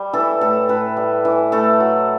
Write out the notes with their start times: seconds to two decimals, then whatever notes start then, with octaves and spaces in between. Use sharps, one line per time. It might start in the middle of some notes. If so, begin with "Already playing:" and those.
Already playing: G3
0.13 E3 A4
0.41 A2 A4
0.69 A2 B4
0.97 G3
1.25 E3
1.52 A3 A4
1.80 F#3